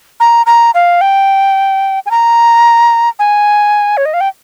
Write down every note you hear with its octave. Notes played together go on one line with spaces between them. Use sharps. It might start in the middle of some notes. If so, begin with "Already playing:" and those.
A#5
A#5
F5
G5
G#5
A#5
G#5
C#5
D#5
F5
G5